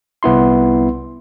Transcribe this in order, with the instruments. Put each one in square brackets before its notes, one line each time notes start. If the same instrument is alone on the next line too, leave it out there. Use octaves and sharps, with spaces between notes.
[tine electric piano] C2 B3 E4 C6